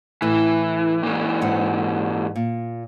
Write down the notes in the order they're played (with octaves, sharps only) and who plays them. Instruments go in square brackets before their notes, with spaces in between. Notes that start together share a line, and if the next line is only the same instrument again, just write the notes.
[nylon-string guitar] A2 [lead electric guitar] E3
[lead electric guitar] A#2 E3
[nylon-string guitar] G#2 F#5
A#2